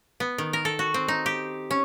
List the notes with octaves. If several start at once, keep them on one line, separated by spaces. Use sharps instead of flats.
B3
D#3
A#4
A4
F#4
C4
D#4
G4
C#4